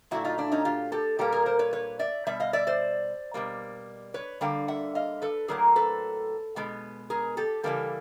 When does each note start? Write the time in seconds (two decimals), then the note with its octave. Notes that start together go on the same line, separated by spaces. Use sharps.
0.11 A#2 F#3 A3 E4 F#4
0.24 D#4 F4
0.38 D4 E4
0.52 C#4 D#4
0.65 F4 G4
0.92 G4 A4
1.19 A#2 G3 A#3 G4 A4
1.32 G#4 A#4
1.46 A#4 C5
1.59 B4 C#5
1.73 B4 C#5
1.99 D5 E5
2.27 B2 G3 E5
2.40 D#5 F5
2.53 D5 E5
2.67 C5 D5
3.34 B2 G3 A#3
4.14 B4 C#5
4.41 D3 G3 A#3 F5 G5
4.68 E5 F#5
4.95 D#5 F5
5.22 A4 B4
5.48 A2 F#3 A#3 G#4 A#4
5.76 A4 B4
6.56 B2 G#3 B3
7.10 G#4 A#4
7.37 G4 A4
7.63 C#3 E3 G3 A#3 G4 A4